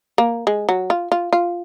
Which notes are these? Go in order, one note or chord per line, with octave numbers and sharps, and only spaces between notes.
A#3
G#3
F#3
F4
F4
F4